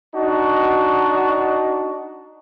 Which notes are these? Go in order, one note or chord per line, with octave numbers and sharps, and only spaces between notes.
D4 D#4 F#4